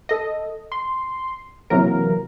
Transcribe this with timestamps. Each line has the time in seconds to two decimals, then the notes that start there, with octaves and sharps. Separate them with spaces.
0.09 A4 D#5
0.72 C6
1.70 C3 E3 F#3 A#3 A#4